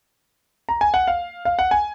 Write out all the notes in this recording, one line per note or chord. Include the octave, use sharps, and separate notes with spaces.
A#5
G#5
F#5
F5
F5
F#5
G#5